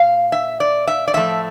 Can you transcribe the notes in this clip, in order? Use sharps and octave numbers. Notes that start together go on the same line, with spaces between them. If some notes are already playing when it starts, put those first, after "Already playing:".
Already playing: A#2 F5
E5
D5
E5
D5
A2 F3 A3 E5